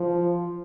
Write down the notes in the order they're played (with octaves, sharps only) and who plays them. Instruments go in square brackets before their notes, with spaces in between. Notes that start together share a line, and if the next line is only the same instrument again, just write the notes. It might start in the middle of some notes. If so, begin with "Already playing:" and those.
Already playing: [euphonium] F3